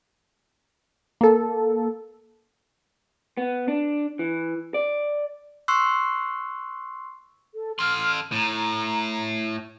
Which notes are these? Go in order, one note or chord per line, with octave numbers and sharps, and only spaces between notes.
A#3 A4
B3
D4
E3
D5
C6 C#6 E6 F#6 C7
A4
A4 C6 F6
A2 A#5